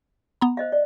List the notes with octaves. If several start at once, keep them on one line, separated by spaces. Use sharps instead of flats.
B3 A#5
C5 D#5 F5
D5